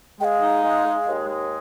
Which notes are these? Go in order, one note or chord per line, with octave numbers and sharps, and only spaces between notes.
G#3 F5 G5
D#4
G#3
G#3
D#2
G#3